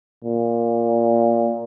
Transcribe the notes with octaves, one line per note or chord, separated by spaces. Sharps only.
A#2